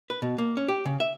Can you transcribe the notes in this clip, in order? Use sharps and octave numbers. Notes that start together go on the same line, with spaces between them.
B4
B2
A#3
C#4
G4
C#3
E5